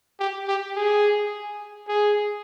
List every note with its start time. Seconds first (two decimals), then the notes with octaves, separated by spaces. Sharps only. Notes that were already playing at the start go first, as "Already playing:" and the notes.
0.20 G4
0.48 G4
0.76 G#4
1.88 G#4